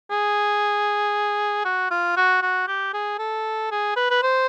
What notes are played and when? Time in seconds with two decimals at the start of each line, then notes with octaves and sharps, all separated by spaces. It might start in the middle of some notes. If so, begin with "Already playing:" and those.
0.11 G#4
1.65 F#4
1.91 F4
2.17 F#4
2.42 F#4
2.68 G4
2.94 G#4
3.19 A4
3.71 G#4
3.96 B4
4.11 B4
4.23 C5